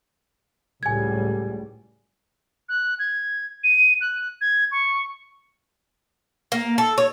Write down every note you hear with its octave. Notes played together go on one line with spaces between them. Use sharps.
C#2 A2 G3 G#5 G#6
F#6
G#6
D#7
F#6
G#6
C#6
A#3
A4
C#5